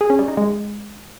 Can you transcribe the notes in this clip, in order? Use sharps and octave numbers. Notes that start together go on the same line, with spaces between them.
G#4
C#4
G3
D#4
G#3